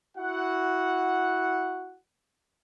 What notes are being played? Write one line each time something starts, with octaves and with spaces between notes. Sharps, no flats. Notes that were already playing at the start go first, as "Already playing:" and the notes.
E4 F#4 F#5